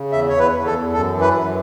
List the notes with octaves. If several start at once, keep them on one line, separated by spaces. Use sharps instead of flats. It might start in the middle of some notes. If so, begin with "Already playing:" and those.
Already playing: C#3
E2 E5
E2 C#5
B4
E2
A4
E2
F#2 A4
E3
B4
F#2